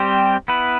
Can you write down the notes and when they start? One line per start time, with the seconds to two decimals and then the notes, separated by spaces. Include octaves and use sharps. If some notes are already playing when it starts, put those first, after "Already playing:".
Already playing: G3 C4 G4 C5
0.48 B3 E4 B4